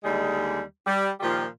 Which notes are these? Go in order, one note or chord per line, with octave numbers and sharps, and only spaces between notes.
D#2 D3 G3 G#3
G3
A#2 D#3 F3 G3 F4